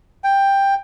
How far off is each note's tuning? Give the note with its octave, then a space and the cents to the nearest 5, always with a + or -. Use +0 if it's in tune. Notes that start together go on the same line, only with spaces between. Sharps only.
G5 +10